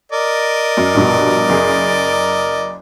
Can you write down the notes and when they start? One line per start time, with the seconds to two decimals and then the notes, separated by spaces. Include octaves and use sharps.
0.12 A#4 D5 D#5
0.77 F#2
0.95 A#1 G2 B2
1.49 F#1 G#4